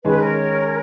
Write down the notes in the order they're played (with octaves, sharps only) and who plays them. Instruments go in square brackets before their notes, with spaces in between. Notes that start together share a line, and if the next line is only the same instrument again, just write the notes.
[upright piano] D#3 G#3 C#4 [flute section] B4
[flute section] A#4 C#5